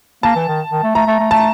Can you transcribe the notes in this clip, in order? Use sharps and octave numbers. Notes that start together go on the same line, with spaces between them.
A#3 A5
E3
D#3
D#3
A3
A3 A#5
A3
A3
A3 A5